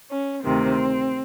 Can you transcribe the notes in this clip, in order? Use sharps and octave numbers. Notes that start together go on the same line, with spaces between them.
C#4
D2 C3 D#3 C4